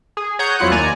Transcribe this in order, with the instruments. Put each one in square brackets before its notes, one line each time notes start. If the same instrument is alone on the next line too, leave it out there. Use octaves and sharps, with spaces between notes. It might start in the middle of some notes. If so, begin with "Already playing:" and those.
[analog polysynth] G#4
C#5 F#5 A#5 D#6 G6
F2 F#3 E4 F4 F#5 F#6
D#2 D5 G#5 A#5